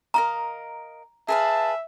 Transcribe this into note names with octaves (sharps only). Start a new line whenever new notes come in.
A#4 D#5 F5 A#5
G#4 B4 E5 F5 A5